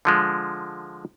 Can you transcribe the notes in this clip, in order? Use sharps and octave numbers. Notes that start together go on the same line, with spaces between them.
D3 F3 G#3